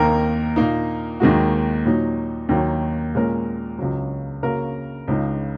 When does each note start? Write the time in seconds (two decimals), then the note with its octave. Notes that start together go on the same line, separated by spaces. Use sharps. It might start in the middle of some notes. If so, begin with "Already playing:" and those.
Already playing: D#2 D#3 A#3 D#4 A#4
0.56 A#2 A#3 D#4
1.20 D#2 D#3 G#3 F#4
1.85 A#2 F#3 D#4
2.49 D#2 D#3 F#3
3.15 A#2 G#3 C#4 A#4
3.78 C#2 C#3 F#3
4.43 C#3 A#3 F#4 A#4
5.08 C#2 C#3 G#3 D#4